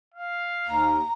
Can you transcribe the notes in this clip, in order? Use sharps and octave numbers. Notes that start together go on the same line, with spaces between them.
F5
D#2 A#5